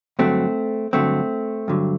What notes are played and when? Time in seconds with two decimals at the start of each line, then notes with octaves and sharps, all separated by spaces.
0.19 G2 D3 F#3 A3 C4
0.93 G2 D3 F#3 A3 C4
1.68 G2 D3 F#3